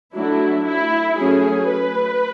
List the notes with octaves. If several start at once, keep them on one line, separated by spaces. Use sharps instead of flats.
F#3 A3 D4 E4
E4
F#3 A3 C#4 G#4
B4